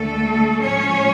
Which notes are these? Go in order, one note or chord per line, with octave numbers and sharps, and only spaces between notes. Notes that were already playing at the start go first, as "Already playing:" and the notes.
Already playing: D2 D3 G#3 A3 A4
A2 F3 G#3 C#4 C#5